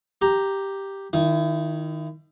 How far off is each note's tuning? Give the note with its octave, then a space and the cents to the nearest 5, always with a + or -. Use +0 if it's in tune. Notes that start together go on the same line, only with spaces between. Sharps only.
G4 +0 A#5 +0
D#3 +0 E4 +35